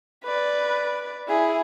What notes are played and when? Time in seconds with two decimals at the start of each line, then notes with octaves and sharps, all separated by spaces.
0.24 B4 D5
1.28 E4 G#4